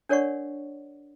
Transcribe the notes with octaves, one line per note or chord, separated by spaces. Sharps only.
D4 A#4 C#5 D5 F#5 C#6